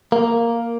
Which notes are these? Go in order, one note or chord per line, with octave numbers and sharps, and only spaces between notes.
A#3